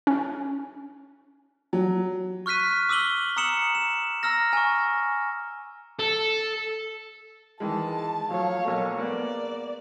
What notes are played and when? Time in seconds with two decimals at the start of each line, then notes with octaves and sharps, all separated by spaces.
0.07 C#4
1.73 F#3
2.46 C#6 F6 F#6 B6 D#7
2.89 D6 E6 D#7 F#7 G7
3.37 A#5 D#6 E6 C#7 E7 F#7
3.75 E7
4.23 A#5 E6 F6 A#6
4.53 G#5 C#6
5.99 A4
7.60 D#3 E3 G#3 A5
8.31 F3 F#3 A3 C#5 F5
8.65 B1 A#3 A4
8.98 G#3 A#3 B3 D5